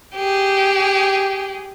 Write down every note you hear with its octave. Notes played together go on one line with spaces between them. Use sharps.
G4 G#4